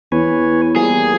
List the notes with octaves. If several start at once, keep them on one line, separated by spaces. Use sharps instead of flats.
E2 B4 C#5 G#5
F3 G3 A#3 G#4